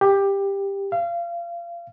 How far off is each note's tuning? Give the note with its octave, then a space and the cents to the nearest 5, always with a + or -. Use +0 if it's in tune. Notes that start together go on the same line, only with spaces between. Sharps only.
G4 +15
F5 -30